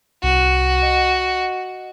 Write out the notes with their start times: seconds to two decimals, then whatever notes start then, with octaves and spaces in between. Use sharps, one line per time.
0.23 C2 F#4
0.82 D#5 F#5